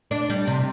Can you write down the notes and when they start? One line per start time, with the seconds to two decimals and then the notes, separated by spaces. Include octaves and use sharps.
0.11 D4
0.30 G3
0.47 C3